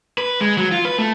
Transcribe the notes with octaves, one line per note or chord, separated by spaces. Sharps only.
B4
G#3
F#3
F4
B4
A3